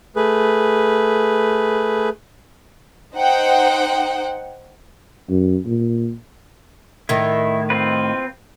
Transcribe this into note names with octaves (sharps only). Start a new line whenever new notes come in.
A3 G#4 B4
D#4 C5 F#5 G5
F#2
A#2
A2 D#3 E4
C4 F4 B4